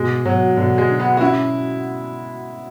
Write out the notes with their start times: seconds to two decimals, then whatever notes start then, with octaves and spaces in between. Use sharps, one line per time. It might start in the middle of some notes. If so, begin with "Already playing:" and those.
Already playing: B2 G#3
0.25 B2 F#3
0.57 B2 D3
0.78 G#3
0.90 D4
1.00 B3
1.17 F#4
1.21 C#4 E4